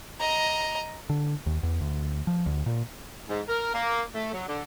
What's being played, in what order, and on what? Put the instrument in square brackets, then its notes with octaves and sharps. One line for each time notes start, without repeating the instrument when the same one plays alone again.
[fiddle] D#5 A#5
[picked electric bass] D3
D#2
E2
D2
F3
D2
A#2
[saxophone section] G#2
A#4
A#3
A3
F#3
D3